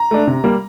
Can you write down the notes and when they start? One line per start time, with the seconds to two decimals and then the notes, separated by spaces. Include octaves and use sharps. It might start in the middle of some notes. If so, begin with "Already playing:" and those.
Already playing: A#5
0.11 A3 D4
0.27 C3
0.44 G3 A#3